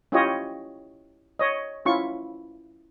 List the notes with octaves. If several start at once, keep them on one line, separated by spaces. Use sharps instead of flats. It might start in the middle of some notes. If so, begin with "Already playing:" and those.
C#4 E4 F4 G4 C#5 D#5
C#5 D#5
C#4 E4 F4 C#6